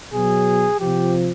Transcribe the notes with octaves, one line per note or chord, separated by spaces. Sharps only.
B2 F#3 G#4
C3 F3 G4